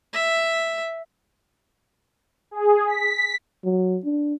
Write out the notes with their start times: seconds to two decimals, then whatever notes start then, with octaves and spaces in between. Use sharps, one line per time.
0.13 E5
2.51 G#4
2.87 B6
3.65 F#3
4.04 D4